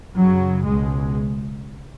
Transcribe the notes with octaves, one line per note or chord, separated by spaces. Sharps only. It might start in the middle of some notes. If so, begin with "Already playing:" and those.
F#2 C#3 F#3
C#2 B2 G#3